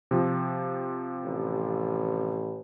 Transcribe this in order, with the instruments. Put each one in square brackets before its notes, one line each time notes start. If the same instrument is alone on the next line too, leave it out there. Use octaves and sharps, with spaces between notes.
[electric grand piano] C3 F3
[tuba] A1